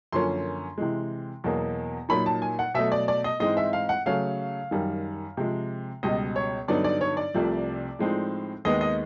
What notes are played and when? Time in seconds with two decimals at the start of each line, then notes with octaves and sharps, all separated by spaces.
0.12 F#2 D3 F3 A#3 C#4 C6
0.78 C3 E3 G#3
1.44 E2 B2 F#3 A#3
2.09 A#2 F#3 A#3 D#4 B5
2.26 A5
2.42 G#5
2.59 F#5
2.74 B2 F#3 A3 E5
2.92 D5
3.08 D5
3.24 D#5
3.40 G#2 E3 G#3 C4 D#5
3.57 E5
3.73 F5
3.89 F#5
4.06 C#3 F#3 A3 C#4 F5
4.71 F#2 D#3 G3
5.37 C3 F3 G#3
6.03 C#2 B2 G3 D#5
6.36 C#5
6.68 G2 D3 F#3 B3 D#4 D5
6.84 D5
7.01 C#5
7.17 D5
7.34 C2 C3 F3 A3
7.99 A2 F3 G#3 C4 D#4
8.65 D#2 D#3 G#3 B3 D#4 D#5
8.81 D#5